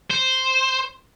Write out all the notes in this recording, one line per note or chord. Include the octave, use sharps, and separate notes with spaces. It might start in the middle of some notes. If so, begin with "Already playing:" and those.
C5